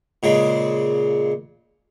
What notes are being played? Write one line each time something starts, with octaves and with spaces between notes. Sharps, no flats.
A#2 C#3 G#3